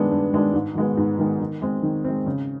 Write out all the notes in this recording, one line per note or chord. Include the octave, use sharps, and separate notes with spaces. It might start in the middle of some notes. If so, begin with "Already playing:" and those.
Already playing: G2 D#3 G#3 B3 D4
G2
D#3 G#3 B3 D4
G#2
D#3 G#3 B3
G#2
D#3 G#3 B3
D#3
G#3 C4
D#3
G#3 C4
C#3